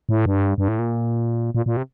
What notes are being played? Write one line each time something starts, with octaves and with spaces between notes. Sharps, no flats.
A2
G2
G2
A2
A#2
A#2
A#2
C3